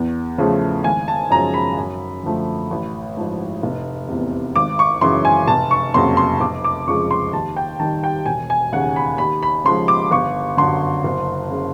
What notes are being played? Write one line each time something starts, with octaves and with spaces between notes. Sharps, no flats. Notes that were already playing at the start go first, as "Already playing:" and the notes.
Already playing: E2
C#3 F3 A3
G#1 G#5
A5
F#2 C#3 F3 G#3 A#5
B5
F#2
D3 F3 A3
A1
G#2 F3
F1
E2 C3
G#1 D6
C#6
F#2 C#3 E3 C6
G#5
F1 A5
C#6
F2 C#3 F#3 A#3 C6
C6
F1 D6
D6
F2 C#3 F3 G#3 C#6
C6
D#2 A5
G5
D#3 G3 A5
G5
E1 G#5
G#5
D#2 C#3 F#5
B5
D#2 B5
B5
C#3 F3 G#3 C6
D6
G1 C#6
F#2 D3 C6
F#1
C#3